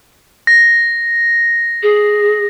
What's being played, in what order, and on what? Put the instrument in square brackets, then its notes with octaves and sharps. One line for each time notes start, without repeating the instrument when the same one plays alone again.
[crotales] A#6
[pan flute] G#4